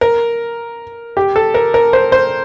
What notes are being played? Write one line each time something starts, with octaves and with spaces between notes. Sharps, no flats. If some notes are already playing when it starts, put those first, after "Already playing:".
A#4
G4
A4
A#4
A#4
C5
C5